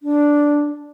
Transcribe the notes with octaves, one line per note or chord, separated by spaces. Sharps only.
D4